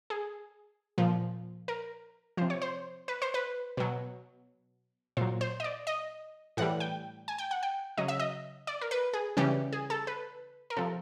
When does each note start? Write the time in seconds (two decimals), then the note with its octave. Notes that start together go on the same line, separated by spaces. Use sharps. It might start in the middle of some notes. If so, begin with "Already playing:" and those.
0.10 G#4
0.98 A#2 F3
1.68 A#4
2.37 C3 F3 C5
2.50 C#5
2.62 C5
3.08 B4
3.22 C5
3.34 B4
3.77 B2 F#3
5.17 A#2 F#3 C5
5.41 C5
5.60 D#5
5.64 D5
5.87 D#5
6.57 A2 E3 G3 F#5
6.80 G5
7.28 G#5
7.38 G5
7.51 F#5
7.63 G5
7.98 C#3 F#3 D#5
8.08 E5
8.20 D#5
8.67 D5
8.81 A#4
8.91 B4
9.13 G#4
9.37 C#3 E3 G3 G4
9.73 G#4
9.90 A4
10.07 B4
10.70 A#4
10.77 C3 F3 A4